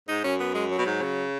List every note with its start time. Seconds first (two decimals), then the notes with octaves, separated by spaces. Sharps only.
0.08 G#2 D#4
0.24 F#2 C#4
0.40 B3
0.54 G#3
0.70 F#3
0.78 B2
0.86 G#2
1.02 C#3